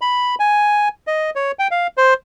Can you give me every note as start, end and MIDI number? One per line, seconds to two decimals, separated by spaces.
0.01 0.35 83
0.40 0.89 80
1.07 1.30 75
1.36 1.52 73
1.59 1.68 79
1.71 1.87 77
1.97 2.14 72